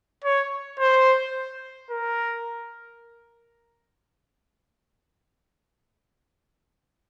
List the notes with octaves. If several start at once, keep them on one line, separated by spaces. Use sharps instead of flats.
C#5
C5
A#4